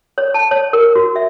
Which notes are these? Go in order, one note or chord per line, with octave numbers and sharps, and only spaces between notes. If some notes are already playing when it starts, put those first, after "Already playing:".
C#5
A5
C#5
A#4
F#4
E5